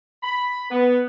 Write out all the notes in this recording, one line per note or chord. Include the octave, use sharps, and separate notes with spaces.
B5
B3